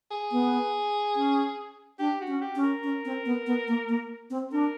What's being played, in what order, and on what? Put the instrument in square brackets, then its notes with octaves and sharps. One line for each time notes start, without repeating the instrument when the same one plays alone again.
[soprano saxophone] G#4
[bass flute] B3
C#4
[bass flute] D4 [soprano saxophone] G4
[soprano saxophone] F#4
[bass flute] C#4
[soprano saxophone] G4
[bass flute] C#4
[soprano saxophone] A#4
[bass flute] C#4
C4
B3
B3
A#3
A#3
C4
[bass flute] D4 [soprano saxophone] A#4